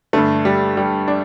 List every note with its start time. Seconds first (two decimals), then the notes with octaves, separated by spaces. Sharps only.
0.13 G2 D3 A3
0.45 G3
0.77 G3
1.08 D4